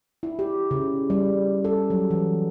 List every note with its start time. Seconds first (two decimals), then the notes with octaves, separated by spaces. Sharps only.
0.23 E4
0.39 G4
0.71 C#3
1.10 G3
1.65 A4
1.90 F#3
2.11 E3